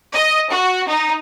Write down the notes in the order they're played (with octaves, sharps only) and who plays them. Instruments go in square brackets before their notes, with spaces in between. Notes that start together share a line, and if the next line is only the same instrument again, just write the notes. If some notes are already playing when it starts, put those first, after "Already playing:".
[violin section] D#5
F#4
D#4